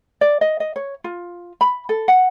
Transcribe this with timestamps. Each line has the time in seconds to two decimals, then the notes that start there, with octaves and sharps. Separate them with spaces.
0.21 D5
0.41 D#5
0.60 D#5
0.76 C#5
1.04 F4
1.61 B5
1.89 A4
2.08 F#5